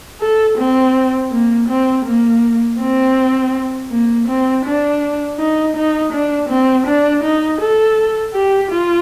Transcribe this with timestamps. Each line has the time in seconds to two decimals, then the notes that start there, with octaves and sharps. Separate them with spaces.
0.21 A4
0.58 C4
1.32 A#3
1.68 C4
2.06 A#3
2.80 C4
3.91 A#3
4.28 C4
4.65 D4
5.39 D#4
5.76 D#4
6.13 D4
6.49 C4
6.87 D4
7.24 D#4
7.61 A4
8.34 G4
8.71 F4